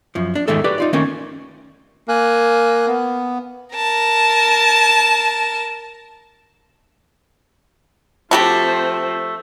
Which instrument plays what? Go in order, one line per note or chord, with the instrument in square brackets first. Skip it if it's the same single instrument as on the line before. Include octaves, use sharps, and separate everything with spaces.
[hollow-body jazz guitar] F#2 F3
D4
E2 G#2 D#3 G#3 A3 A4
F#4 G4 B4 D5
D#4 F4 D5
D#3 A3 A#3 C4 C#4
[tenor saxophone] A#3 [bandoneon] G#5 F#6
[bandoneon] B3
[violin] A#4 A5
[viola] F3 C4 [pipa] A3 F#4 G4